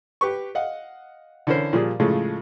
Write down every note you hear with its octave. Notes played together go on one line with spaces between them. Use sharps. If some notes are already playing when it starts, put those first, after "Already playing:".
G4 B4 C#6
D#5 F5 F#5
D3 E3 C#4 E4 A#4 C5
A#2 F3 G3 G#4
A2 C#3 F3 G#3 A3